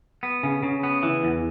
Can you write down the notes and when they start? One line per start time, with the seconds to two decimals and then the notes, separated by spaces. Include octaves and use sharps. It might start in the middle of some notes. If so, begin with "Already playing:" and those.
0.23 B3
0.43 C#3
0.63 C#3
0.83 B3
1.03 E3
1.24 E2